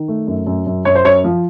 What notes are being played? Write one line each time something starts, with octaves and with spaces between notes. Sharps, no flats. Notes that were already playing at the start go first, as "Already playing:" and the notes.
Already playing: D#3
A3
F#2
F#2
F#2
F#2 C#5
C5
F#2 C#5
F3